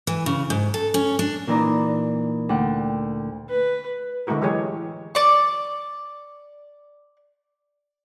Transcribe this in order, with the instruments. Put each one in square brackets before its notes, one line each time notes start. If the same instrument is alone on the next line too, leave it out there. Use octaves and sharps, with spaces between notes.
[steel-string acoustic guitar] E3
C#3
G#2
A4
C#4
D4
[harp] A#2 E3 D#4 D5 A#5
D2 F#5 G5
[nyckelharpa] B4
[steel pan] D3 G#3 A3 E4 F#4 A#4
E3 F#3 G#3 G4 G#4 C#5
[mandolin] D5 C#6